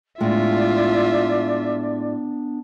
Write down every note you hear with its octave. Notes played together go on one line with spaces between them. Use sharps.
A2 G#3 B3 D4 F4 D5 E5